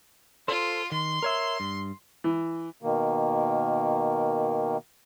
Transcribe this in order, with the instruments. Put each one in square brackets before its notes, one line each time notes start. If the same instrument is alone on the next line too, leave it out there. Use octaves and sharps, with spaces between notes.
[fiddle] F4 [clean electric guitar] A4 C5
[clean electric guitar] D#3 [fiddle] C6
[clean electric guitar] A#4 C#5 E5
G2
[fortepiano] E3
[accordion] B2 D#3 A#3